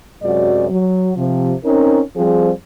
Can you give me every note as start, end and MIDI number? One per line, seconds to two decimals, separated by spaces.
0.22 0.69 42
0.22 0.69 48
0.22 0.69 54
0.22 0.69 56
0.22 0.69 66
0.22 0.69 74
0.69 1.10 54
1.16 1.53 48
1.16 1.53 53
1.64 2.00 60
1.64 2.00 61
1.64 2.00 63
1.64 2.00 70
2.16 2.50 53
2.16 2.50 55
2.16 2.50 60
2.16 2.50 67
2.16 2.50 68